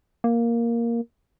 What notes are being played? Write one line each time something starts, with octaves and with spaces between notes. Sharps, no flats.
A#3